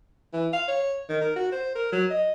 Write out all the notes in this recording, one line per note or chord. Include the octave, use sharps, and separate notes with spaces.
E3
F5
C#5
D#3
A#4
F#4
C5
A#4
F#3
D#5